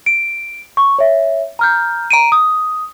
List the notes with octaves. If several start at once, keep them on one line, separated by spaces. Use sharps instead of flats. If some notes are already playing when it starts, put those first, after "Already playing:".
D7
C#6
C#5 E5
A#5 F6 G6
A#5 D7 D#7
D#6